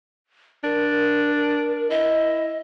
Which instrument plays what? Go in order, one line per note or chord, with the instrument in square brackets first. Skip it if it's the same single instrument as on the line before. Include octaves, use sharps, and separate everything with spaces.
[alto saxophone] D4 [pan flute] A#4
[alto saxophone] E4 [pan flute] D#5